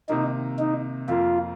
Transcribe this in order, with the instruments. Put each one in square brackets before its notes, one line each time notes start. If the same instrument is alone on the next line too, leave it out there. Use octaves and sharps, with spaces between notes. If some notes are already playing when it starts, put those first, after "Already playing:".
[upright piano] C3 D#3 A#3 [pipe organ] D#4
[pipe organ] D#4
[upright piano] F2 F3 A#3 [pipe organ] F4